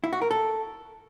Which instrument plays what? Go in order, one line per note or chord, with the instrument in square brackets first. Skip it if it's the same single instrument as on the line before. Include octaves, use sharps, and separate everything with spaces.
[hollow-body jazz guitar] E4
F#4
A#4
A4